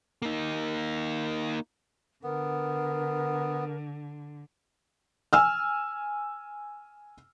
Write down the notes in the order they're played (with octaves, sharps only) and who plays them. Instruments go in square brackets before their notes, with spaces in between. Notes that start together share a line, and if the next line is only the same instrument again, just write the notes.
[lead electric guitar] A#3 D#4
[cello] D3 [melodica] B3 [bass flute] A#4
[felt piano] G#5 E6 F6